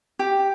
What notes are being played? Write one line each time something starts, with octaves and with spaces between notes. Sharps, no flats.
G4